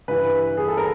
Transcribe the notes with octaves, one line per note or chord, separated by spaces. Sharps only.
G2 E3 B4
G#4
A4
A#4